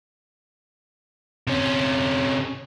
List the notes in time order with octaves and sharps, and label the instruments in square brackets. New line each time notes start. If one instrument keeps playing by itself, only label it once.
[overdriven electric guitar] C3 C#4